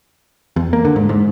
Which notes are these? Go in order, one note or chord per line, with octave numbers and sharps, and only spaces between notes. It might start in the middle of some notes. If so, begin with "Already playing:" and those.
E2
A#3
D3
G#2
G#2